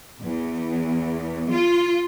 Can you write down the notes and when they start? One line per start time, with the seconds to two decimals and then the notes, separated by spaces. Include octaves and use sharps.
0.22 E2
1.51 F4